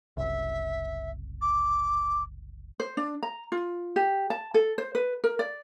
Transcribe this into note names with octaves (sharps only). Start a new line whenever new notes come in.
F#1 C2 E5
D6
C5
D4
A#5
F4
G4
A5
A4
C5
B4
A#4
D5